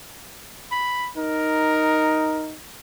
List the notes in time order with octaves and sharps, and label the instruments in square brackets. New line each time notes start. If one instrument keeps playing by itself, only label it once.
[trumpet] B5
[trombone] D#4 [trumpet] A#4